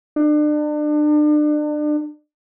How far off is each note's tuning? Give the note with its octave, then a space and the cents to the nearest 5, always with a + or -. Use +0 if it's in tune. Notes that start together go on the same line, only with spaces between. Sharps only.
D4 +35